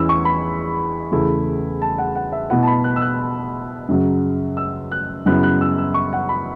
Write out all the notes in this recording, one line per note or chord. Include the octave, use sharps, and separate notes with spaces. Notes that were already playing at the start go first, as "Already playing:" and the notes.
Already playing: E2 E3 C#4 E4 E6
C#6
B5
E2 C#3 A3 E4
A5
F#5
F#5
E5
B2 B3 E4 F#5
A5
B5
F#6
E6
F#6
F#2 C#3 F#3
E6
F#6
F#2 C#3 F#3 B3 E4 F#6
F#6
E6
E6
C#6
F#5
B5